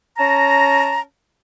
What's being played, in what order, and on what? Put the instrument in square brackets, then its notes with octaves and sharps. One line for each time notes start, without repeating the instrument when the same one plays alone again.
[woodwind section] C#4 A5 A#5